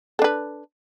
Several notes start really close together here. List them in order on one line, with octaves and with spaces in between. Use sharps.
A4 D4 B4